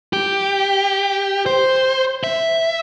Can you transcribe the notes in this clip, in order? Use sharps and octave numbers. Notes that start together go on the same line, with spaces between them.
G4
C5
E5